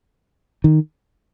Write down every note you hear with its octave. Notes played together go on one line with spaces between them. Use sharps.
D#3